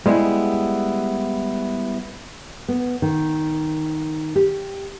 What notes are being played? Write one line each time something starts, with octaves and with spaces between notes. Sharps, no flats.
G3 G#3 B3 E4
B3
D#3
G4